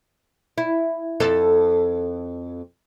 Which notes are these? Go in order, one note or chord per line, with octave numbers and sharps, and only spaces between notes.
E4
F2 A4